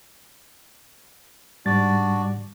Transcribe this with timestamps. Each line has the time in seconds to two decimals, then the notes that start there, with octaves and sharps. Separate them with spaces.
1.66 G#2 G3 D4 F#4 D5 A6